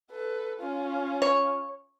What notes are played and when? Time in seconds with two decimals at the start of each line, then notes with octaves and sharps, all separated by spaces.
0.11 A4 B4
0.60 C#4 F4
1.22 C#5